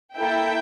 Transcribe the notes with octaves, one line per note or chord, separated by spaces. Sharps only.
A#3 E4 A4 E5 G5